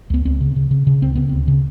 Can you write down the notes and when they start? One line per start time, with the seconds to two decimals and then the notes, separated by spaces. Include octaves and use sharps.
0.10 C#2 B3
0.25 C#2 C4
0.41 C#3
0.56 C#3
0.71 C#3
0.87 C#3
1.02 C#2 C4
1.15 C#3 B3
1.29 D2 C4
1.48 C#3